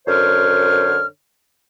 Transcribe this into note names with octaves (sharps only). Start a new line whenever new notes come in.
F#2 D3 C5 C#5 F6